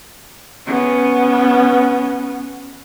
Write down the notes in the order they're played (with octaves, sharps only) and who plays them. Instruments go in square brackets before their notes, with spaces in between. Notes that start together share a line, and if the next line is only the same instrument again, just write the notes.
[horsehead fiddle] B3 C#4